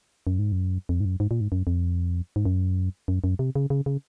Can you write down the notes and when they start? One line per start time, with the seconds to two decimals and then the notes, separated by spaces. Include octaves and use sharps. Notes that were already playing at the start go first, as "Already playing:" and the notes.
0.27 F#2
0.39 G#2
0.52 F#2
0.89 F2
1.00 G#2
1.05 F#2
1.20 G#2
1.31 A#2
1.41 G#2
1.52 F#2
1.67 F2
2.36 G#2
2.45 F#2
3.08 F#2
3.24 F#2
3.39 C3
3.55 C#3
3.70 C#3
3.86 C#3